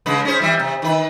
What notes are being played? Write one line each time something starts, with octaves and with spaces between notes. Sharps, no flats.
C#3 G#3 B4
C#4 G#4 C5
E3 G3 E5
C3
D#3 B4